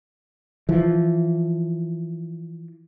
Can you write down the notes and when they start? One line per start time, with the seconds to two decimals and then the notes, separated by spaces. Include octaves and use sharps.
0.69 E3 F3